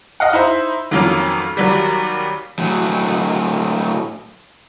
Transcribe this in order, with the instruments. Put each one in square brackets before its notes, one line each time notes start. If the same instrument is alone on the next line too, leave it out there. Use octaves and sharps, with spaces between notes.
[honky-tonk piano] D#5 F5 F#5
D#4 E4 C5 E5
F2 D#3 F#3 A#3 C#4 F4
D#2 F#3 G3
[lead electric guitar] A2 F#3